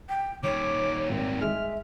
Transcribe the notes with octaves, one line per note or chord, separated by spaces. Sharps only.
G5
D#3 G3 C#5 D6
G#1 C4
G#3 E5 F6